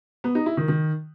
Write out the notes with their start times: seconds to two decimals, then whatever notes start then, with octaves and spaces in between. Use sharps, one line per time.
0.24 B3
0.35 D#4
0.46 E4
0.57 D#3
0.68 D#3